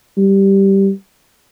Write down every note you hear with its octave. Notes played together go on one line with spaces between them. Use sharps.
G3